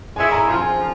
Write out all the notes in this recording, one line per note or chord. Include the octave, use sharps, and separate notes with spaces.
G#3 C#4 E4 G#5
A#5
F3 C4 F4 C6
G#5
F3